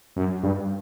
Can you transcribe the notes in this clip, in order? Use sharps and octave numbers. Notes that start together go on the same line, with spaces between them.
F#2
G2